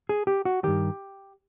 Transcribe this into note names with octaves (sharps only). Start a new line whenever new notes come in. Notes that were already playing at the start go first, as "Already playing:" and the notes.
G#4
G4
F#4
G2 D#3 G4